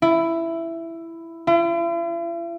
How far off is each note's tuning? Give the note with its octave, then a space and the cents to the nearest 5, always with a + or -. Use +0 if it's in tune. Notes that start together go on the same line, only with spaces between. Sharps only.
E4 +10
E4 +45